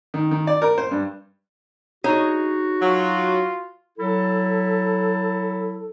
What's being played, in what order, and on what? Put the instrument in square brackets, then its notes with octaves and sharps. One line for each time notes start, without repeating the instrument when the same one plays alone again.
[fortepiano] D#3
D#3
D5
A#4
C5
G2
[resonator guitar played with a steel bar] D#4 G#4 C#5 [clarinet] F#4
[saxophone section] F#3 [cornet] F4
[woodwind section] F#3 E4 A4